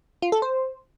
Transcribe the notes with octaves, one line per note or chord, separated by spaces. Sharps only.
F4
A4
C5